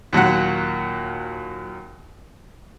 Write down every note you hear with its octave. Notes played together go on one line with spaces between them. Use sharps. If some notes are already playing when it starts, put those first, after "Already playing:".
D#2 A#2 F#3 F#5